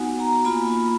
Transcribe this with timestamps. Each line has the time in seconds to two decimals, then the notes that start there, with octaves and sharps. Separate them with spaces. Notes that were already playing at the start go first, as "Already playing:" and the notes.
Already playing: B3 D#4 F#4 F#5 G#5
0.20 A#5
0.45 A#3 F4 B5